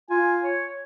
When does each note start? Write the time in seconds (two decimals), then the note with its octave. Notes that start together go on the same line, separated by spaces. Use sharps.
0.10 F4 G#5
0.43 C#5